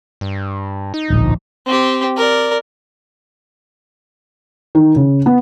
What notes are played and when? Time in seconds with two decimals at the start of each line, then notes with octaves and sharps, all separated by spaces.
0.21 G2
0.94 D#4
1.10 D1 A#1
1.67 C4 G4
2.17 A#4 D5
4.75 D#3
4.96 C#3
5.26 B3